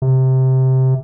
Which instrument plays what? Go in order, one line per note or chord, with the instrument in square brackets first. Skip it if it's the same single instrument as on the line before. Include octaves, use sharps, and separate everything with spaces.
[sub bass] C3